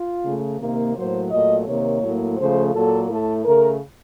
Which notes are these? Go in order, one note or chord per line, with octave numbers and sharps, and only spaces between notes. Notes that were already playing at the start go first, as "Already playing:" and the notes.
Already playing: F4
C#3 A3
C3 D#3 A#3
A2 F#3 A#3 C5
A#2 F#3 A3 D#5
C3 D#3 A#3 C#5
A2 F#3 A#3
C#3 F3 A3 C5
A#2 F#3 A#3 A4
A2 A3 A4
C#3 A3 A#4